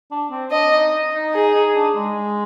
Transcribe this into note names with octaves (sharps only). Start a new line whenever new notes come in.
D4
C4
D4 D#5
D#4
D#4
D#4 G#4
D#4
D4
G#3